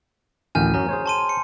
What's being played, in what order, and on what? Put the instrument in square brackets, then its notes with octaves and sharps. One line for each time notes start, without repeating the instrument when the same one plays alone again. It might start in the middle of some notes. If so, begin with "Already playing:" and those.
[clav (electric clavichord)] A1 D2 D#3 [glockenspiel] G#5 F6 G6
[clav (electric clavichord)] F#2 F#3 C#4 [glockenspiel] A#5
[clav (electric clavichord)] G#4 C5 C#5
[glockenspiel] A5 C6 D#7
C#7